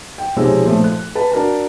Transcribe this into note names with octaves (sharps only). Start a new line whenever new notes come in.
G5
B1 C3 F3 G#3 C#5 E6
A#2 F3 A3
F#6
B4 A5
D4 F#4 A#4 A5